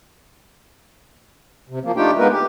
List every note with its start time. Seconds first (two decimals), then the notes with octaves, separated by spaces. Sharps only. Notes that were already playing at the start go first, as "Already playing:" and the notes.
1.69 C3
1.84 F3 A#3
1.96 A3 D4 D#4 F4 G4 G5
2.18 G#3 A#3 B3 D#4 A#4 B4
2.32 G4